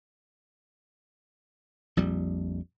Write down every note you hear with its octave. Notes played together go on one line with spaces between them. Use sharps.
A#1 F2 G3